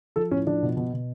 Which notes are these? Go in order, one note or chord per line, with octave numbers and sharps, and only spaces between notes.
F3 A4
A2 C#4
F3 D4
B2
B2
B2